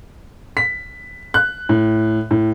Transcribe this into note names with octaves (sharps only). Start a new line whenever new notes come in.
B6
F#6
A2
A2